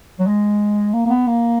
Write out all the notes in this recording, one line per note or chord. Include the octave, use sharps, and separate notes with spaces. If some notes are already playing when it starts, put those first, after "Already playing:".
F#3
G#3
A#3
A#3
B3
A#3